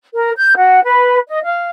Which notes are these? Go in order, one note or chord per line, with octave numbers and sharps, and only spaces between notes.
A#4
G6
F#4
B4
D#5
F5